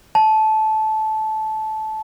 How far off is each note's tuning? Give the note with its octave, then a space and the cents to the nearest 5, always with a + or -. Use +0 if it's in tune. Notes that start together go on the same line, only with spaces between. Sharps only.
A5 -15